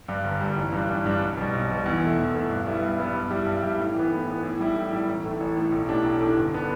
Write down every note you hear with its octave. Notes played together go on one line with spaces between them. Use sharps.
G2 G3
G1
G2 G3
A1
G2 G3 D4
A1
G2 G3 D4
B1
B2 G3
B1
B2 G3
E2
B2 A3 E4
E2
B2 A3 E4
G2
G3 B3 E4
G2
G3 B3 E4
G2
G3 E4 G4
G2
G3 E4 G4
A2
E3 B3
A2
E3 B3
A2
G3 E4 G4
A2
G3 E4 G4
A1
A2 A3
A1
A2 A3
B1
A2 A3 D4 G4
B1
A2 A3 D4 G4
G1
D3 B3 D4